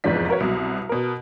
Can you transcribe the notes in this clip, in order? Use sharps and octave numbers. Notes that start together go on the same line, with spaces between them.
F1 E2 G#2 F3 D4 B6
F#4 A#4 B4 C#5
C2 B2 F#3
B2 A#4